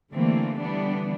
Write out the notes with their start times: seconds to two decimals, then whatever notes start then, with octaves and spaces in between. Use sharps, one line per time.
0.11 D3 E3 G3 A3 A#3 C4
0.59 D3 E3 G3 B3 D4